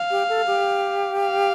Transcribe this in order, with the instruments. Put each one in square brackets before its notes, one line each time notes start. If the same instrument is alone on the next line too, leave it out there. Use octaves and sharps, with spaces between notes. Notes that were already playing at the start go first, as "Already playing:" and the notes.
Already playing: [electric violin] F5
[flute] G4
A4
G4
[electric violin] F5